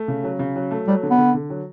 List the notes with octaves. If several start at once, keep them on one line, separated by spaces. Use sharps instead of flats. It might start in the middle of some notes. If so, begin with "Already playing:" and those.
Already playing: A3
C#3
F#3
C#3
F#3
A3
F#3 G3
D3
B3
D3
D3
F#3